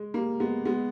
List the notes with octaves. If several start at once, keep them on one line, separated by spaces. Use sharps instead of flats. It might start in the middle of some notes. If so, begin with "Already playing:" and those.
Already playing: G#3
G3 A#3
G#3 B3
G#3 B3